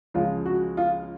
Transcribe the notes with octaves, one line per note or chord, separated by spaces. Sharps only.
C#2 C#3 F3 G#3 F4
F#4
F4